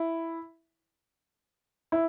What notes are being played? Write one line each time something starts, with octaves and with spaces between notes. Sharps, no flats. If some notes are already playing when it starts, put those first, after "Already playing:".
Already playing: E4
E4